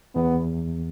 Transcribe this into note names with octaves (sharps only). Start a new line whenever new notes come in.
E2 B3